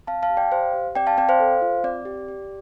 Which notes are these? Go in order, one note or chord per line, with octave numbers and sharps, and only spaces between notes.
C4 F5 A5
F5 A5
G4
D5 G5
G4 C5 F5
G4
C4 D5 G5
F5 A5
C4 D5 G5
C5 F5
A4
F4
C4 D5
G4
G4